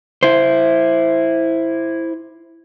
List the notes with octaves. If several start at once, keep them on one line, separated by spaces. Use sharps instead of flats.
E4 C5